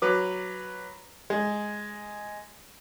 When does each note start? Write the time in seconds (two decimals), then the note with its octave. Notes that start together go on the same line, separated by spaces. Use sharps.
0.02 F#3 B4 D6
1.30 G#3